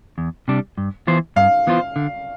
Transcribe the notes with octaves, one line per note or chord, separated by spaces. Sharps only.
E2
C3 G3 D4
G2
E3 B3 F4 C5
G2 F5
E3 B3 F4 C5
D3